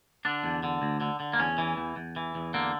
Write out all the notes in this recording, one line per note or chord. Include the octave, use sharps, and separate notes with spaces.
D3 D4
E2
D3
D2
D3
D3
A#3
E2 C#4
E3
E2
E2
E3
E2
D3 A#3